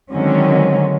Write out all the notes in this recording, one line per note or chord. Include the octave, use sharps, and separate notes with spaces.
D3 D#3 F#3 G#3 C4 C#4